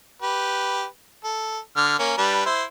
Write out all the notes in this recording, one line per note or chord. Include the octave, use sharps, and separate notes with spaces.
G4 B4
A4
D3 F6
A#3 C#4
G3 D4 B4
E4 C5